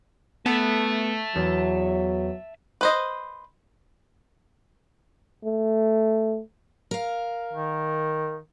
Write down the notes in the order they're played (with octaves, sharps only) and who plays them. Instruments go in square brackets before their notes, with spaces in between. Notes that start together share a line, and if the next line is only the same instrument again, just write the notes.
[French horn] A3 [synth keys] B3 [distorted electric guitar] E5 A5
[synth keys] E2 [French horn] F#3
[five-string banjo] B4 C5 D#5
[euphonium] A3
[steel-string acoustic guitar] A#4 F5
[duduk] D#3